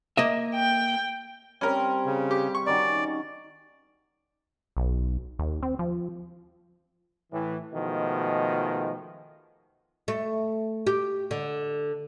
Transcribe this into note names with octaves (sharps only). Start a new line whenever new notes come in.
A#3 D#5 E5
G5
G3 C4 C#4 A#4
C#3
G4
C#6
D#3 C#4 F#4 D5
B1
D#2
C4
F3
A2 E3
B2 D#3 F3 G#3 A3
A3
G4
D3